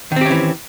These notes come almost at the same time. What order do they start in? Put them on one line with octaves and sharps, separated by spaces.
D#3 C4 G4 C#4 E3